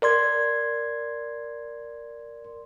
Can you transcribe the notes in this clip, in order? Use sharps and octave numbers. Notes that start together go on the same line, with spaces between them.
A#4 D5 C6 G#6